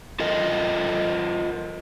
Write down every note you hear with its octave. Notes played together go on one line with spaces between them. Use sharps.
F4 A4 A#4 D#5